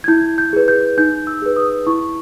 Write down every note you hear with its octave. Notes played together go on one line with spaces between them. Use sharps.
G#6
E4 G6
G6
G#4 B4
G6
D#4 G6
E6
G#4 B4
D#6
E4 C#6